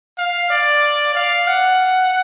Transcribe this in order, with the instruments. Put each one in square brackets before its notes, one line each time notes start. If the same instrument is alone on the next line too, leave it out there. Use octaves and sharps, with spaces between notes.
[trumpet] F5
D5
F5
F#5